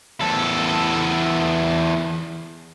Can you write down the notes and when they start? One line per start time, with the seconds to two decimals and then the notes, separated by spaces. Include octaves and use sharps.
0.21 E2 A4